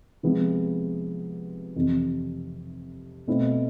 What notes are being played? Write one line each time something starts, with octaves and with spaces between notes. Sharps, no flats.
C3 F3 G#3 B3 E4
F2 C3 E3
B2 A3 C4 E4